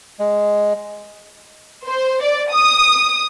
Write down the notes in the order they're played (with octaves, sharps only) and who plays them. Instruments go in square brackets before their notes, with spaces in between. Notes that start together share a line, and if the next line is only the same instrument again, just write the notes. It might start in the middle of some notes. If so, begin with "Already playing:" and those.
[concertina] G#3
[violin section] C5
D5
D#6